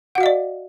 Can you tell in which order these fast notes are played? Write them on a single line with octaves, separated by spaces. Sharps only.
F#5 F#4 F5 D#5 D5